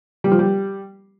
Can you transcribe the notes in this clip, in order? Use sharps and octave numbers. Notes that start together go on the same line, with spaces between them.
G3
F3
G3